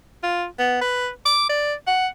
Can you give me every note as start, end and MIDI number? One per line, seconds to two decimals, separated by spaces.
0.23 0.45 65
0.59 0.77 59
0.81 1.09 71
1.25 1.49 86
1.49 1.74 74
1.87 2.07 78